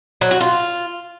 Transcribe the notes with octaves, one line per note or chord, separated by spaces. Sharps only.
F#3
F#4
F4